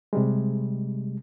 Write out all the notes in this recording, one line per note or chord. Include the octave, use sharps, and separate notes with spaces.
C3 G3 G#3